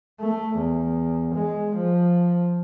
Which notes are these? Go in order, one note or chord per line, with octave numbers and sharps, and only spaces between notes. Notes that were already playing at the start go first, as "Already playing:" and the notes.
A3
E2
G#3
F3